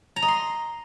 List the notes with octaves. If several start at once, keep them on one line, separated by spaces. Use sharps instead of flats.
A#5
D#5
C6